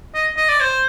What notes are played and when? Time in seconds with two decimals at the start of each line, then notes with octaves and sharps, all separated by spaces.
0.15 D#5
0.37 D#5
0.49 D5
0.60 C5